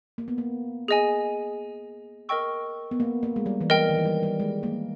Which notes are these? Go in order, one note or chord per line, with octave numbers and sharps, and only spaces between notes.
A#3
B3
A#3
G#4 D#5 G#5
A#4 D#5 G5 C#6 E6
B3
A#3
A#3
G#3
G3
E3
G3 A#4 D#5 G5
D#3
E3
G3
G3
G#3
A#3